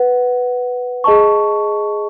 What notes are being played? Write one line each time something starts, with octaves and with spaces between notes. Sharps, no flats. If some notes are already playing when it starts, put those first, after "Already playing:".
Already playing: B4 F#5
G#4 D#5 A5 C#6